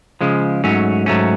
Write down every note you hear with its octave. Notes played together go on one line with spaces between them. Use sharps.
C#3 F3 G#3
G#2 F#3 A3 C#4
G#2 F#3 A3 C#4